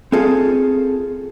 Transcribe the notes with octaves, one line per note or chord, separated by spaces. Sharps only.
C4 F4 G#4 A4